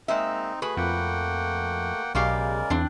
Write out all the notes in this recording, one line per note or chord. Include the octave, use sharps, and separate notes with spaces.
G#3 A#3 C4 D#4 E5
A3 F#4 G#4 B4
F2 A#3 F#5 G5
B1 C#3 G#3 F#4 G4 A#4 D5 F5
E2 C4 D4